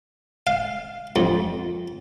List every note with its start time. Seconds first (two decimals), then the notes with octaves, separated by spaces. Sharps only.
0.47 F5
1.16 F2